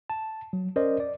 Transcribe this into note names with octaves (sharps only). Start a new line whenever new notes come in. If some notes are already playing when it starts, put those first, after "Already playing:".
A5
F#3
C#4 A#4 C5 D5 D#5
D5